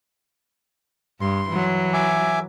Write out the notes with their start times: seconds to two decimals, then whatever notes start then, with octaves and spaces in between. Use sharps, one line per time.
1.21 G2 C6
1.49 E3 F#3
1.93 E5 G#5 D6